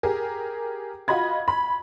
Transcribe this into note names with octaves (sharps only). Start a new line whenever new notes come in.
G4 G#4 A#4
F4 F#4 D#5 B5 G#6
B5